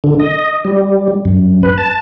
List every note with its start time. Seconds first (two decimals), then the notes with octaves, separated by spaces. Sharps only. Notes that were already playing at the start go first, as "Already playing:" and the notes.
0.04 D3
0.20 D#5
0.65 G3
1.25 F#2
1.63 B4
1.78 A5